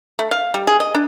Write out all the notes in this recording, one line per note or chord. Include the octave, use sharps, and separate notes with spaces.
A3
F5
G3
G#4
D#5
D4